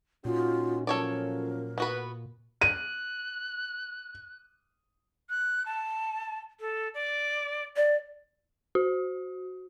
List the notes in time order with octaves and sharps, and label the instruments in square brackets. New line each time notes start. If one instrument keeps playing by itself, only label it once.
[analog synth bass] A#2 [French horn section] C#4 D#4 F#4 [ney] F4
[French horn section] F3 F#3 C#4 [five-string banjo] A4 C#5 D5 [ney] A#4
[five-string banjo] B3 F#4 B4
[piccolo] F#6 [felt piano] D#7
[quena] F#6
A5
A4
D5
[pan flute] D5
[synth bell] F#4